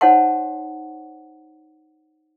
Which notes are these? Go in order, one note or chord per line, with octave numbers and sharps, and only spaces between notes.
D#4 C5 C#5 F#5 A5 C6